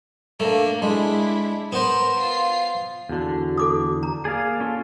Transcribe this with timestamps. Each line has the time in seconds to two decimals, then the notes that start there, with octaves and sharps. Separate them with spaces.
0.40 A3 A#3 D4
0.82 G#3 D4 E4
1.73 B3 A#4 C5 E7
2.20 F4 C7
3.09 E2 D3 F#4
3.58 A4 D6 D#6
4.03 A#5
4.25 A#3 G#4 D5 F5
4.60 C#4 F4 A4